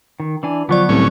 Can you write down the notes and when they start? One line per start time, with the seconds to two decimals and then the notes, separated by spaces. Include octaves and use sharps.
0.20 D#3
0.43 E3 D4 G#5
0.69 D3 F3 F#3 B3 D5 C#6
0.89 C2 A2 C#4 C#5 C#6